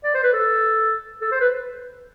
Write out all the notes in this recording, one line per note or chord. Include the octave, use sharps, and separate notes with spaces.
D5
C5
B4
A4
A4
C5
B4